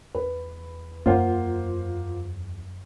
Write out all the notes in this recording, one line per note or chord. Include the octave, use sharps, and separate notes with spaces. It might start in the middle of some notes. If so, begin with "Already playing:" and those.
E2 B4
F#2 A#3 F4 C5 F#5